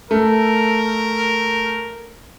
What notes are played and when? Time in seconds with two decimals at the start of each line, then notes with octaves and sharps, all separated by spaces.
0.11 A3 A#4